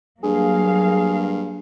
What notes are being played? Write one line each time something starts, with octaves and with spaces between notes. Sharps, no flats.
G2 F#3 A#3 G#4 F5